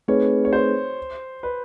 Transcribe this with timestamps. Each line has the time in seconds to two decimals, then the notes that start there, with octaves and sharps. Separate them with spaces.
0.08 A3 C4 D#4 G#4 B4 C#5
0.45 C#5
0.53 C5
1.43 B4